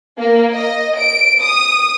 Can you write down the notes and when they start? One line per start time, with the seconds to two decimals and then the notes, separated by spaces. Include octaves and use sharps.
0.19 A#3
0.54 D#5
0.98 D7
1.42 D#6